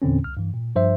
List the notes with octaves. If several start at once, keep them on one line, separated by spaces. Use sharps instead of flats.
E2 A#2 D3 C4 C#4
C2 F6
G2 E3
A#2
G2 F3 C5 E5